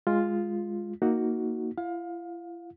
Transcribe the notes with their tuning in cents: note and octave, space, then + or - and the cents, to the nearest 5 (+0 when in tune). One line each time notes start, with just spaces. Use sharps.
G#3 -5 F4 +0
A#3 +0 D#4 +15 F#4 +0
E4 +45 F5 +25